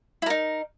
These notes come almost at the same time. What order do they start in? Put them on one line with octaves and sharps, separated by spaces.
E4 A#4 D#4